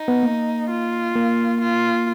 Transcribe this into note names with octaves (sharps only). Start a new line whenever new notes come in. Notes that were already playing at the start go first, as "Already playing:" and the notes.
Already playing: D#4
B3
A#3
F4
A#3
F4